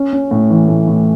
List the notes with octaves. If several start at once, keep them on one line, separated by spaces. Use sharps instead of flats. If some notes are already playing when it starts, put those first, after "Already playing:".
Already playing: C#4
C#4
A2
E3
A2
A2